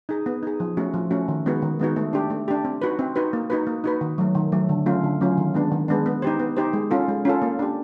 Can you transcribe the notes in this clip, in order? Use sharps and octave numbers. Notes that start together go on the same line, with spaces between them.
D#4 G#4
B3
D#4 G#4
F3
A3 C#4 F#4
F3
A3 C#4 F#4
D#3
G#3 B3 D#4 F#4
D#3
G#3 B3 D#4 F#4
A3
D4 G4
A3
D4 G4
C4
D#4 F#4 B4
C4
D#4 F#4 B4
A#3
D#4 F#4 B4
A#3
D#4 F#4 B4
D#3
F#3 A3
D#3
F#3 A3
D3
F#3 A3 C#4 F4
D3
F#3 A3 C#4 F4
D#3
G#3 B3 D4
D#3
G#3 B3 D4
B3
D#4 G4 C5
B3
D#4 G4 C5
G#3
C#4 F4 A4
G#3
C#4 F4 A4
A#3
D4 G4